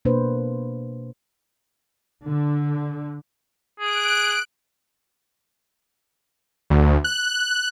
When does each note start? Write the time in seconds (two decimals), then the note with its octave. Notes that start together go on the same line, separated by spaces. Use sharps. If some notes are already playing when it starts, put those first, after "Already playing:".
0.05 B2 A#3 D4 B4 C5
2.25 D3
3.80 G#4 F#6 D7
6.70 D2
7.04 F#6